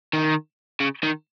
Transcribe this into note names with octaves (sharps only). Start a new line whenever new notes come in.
D#3
C#3
D#3